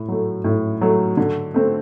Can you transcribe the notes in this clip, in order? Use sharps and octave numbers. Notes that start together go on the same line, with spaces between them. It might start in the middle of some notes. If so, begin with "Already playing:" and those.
Already playing: A2
F#3 A3
A2
F#3 A3
D3
A3 C4